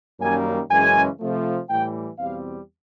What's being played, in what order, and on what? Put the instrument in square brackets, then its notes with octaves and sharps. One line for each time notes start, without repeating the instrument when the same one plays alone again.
[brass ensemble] F#2 D#3 G3 A#3 C#4 G#5
F#2 C#3 E3 G#3 C#4 G#5
C3 F3 A3
A2 E3 G3 G5
E2 B2 G3 C4 F5